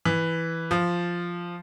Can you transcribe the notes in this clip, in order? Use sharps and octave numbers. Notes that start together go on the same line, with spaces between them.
E3
F3